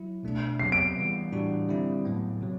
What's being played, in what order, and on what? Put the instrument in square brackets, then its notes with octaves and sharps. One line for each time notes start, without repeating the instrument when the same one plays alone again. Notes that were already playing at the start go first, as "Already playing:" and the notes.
Already playing: [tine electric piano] F#3 E4
B2 A3 D4
[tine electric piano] C3 F#3 B3 [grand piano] C7
[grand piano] D7
[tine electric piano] E3 G3 B3
A2 E3 G3 D4 F#4
D3 G3 C4 E4
A2 F#3 B3
C3 F#3